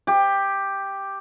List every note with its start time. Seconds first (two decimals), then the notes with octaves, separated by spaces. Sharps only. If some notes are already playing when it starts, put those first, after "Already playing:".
0.07 G4